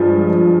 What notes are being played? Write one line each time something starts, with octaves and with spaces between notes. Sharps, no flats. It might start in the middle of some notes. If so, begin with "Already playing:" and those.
Already playing: G2 F3 G#3